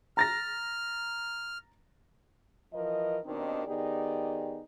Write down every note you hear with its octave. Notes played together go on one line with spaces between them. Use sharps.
A#5 F6 A6 A#6
E3 F3 A#4 D#5
D#2 B2 D#3 C4 D4 D#4
D#3 B3 D#4 G4 G#4 D5